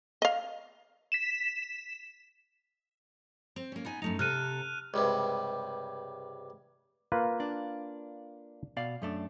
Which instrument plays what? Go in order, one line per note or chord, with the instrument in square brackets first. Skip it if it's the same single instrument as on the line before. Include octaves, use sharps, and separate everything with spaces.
[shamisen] D#5 F5
[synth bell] B6 E7
[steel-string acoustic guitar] C4
A#3 C#4
B3 D#4 G#5
[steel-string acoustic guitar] F#2 A3 D#4 [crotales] F7
[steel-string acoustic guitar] C3 A4 [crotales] F6 F#6 D#7
[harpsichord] C#2 G2 C3
[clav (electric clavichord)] A#3 F4 B4
[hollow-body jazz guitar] D4
B2 D5 F5
F#2 A3 D4